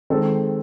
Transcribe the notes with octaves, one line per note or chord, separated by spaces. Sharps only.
D#3 G#3 C4 A4